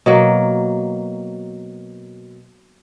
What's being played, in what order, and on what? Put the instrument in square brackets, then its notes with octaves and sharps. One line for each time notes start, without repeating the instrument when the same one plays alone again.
[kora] B2 F#3 A#3